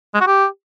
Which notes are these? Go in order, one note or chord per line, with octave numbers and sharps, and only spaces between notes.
G#3
F#4
G4